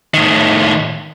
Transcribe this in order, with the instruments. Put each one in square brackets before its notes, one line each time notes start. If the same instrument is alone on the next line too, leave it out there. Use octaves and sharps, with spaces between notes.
[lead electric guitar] A2 D#3